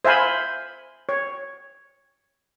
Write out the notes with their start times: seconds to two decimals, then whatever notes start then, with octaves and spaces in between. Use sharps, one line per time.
0.05 C5 E5 F5 G#5 B5
1.09 C#5